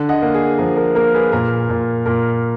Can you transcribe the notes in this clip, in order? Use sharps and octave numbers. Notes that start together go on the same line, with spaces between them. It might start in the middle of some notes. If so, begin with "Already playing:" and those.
Already playing: D3
D#5 F#5
A#3
G#4
F3 A#4
A#4
A#3 A#4
G#4 B4
A#2 A#4
A#2
A#2 A#4